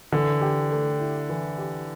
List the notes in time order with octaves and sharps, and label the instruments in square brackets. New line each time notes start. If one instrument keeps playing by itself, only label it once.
[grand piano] D3 [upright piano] E3
[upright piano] G4
A3
E4
E3
G4